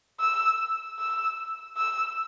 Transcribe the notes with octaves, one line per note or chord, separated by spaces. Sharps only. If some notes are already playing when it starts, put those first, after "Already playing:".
E6
E6
E6